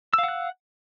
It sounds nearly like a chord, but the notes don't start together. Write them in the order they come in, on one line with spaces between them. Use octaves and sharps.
E6 F5 F#5 F#6